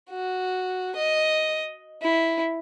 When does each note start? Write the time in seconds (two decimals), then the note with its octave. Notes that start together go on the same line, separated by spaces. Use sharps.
0.10 F#4
0.96 D#5
2.02 E4